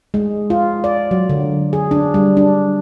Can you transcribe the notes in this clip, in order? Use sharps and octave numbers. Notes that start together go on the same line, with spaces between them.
G#3
F4
D5
F#3
D3
G#4
D4
G3
D4